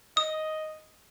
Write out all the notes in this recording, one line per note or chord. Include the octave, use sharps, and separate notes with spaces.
D#5 D#6